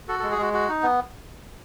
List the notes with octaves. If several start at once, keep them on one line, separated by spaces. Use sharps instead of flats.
F#4 A4
G#3 A4
G#4
G#3 F#4
F#4
D#4
B3